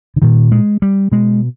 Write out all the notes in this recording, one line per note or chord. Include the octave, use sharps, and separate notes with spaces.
D3
A#2 D#3
G#3
G3
B2 G#3